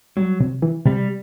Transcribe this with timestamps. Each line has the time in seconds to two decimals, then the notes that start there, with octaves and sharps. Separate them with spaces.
0.17 F#3 G3
0.40 C3
0.62 E3
0.86 C3 G3